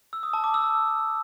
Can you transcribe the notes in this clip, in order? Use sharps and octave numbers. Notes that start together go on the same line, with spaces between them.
E6
D#6
A5
D6
E6